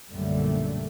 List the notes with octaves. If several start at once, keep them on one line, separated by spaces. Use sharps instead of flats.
A#1 F#2 D3 G3 A3